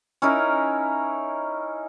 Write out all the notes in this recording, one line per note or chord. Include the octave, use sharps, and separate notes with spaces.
C#4 D#4 E4 A#4